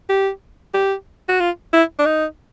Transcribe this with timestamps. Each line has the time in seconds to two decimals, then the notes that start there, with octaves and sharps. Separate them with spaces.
0.10 G4
0.74 G4
1.29 F#4
1.40 F4
1.73 E4
1.99 D4
2.06 D#4